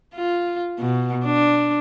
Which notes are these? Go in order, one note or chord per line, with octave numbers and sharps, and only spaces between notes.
F4
B2
D4